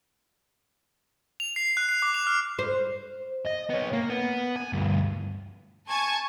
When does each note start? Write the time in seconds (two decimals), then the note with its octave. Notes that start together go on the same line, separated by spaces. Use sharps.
1.40 F7
1.56 C7
1.77 F#6
1.89 C7
2.02 D6
2.14 F7
2.27 F6
2.59 C5
3.45 D#5
3.69 B3 C#5
3.93 A#3
4.10 B3
4.56 G#5
4.73 D2 G2
5.89 G#5 A5 C#6 G#6